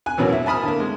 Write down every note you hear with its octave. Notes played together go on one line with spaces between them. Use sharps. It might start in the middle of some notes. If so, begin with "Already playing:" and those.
G#5 F#6
F#2 B2 E3 F#3 A#3
E4
G#5 A5 B5 D#6 F6
D3 A#3
G#3